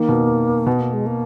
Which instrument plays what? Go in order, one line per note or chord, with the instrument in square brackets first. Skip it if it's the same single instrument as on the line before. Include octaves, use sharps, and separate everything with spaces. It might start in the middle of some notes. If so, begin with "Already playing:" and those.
Already playing: [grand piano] D#3 [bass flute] A#3
[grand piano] B2
[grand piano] B2 [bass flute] B3
[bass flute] A#3
G#3
A#3